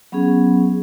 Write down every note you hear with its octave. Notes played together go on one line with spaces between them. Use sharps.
F#3 B3 C#4 G#4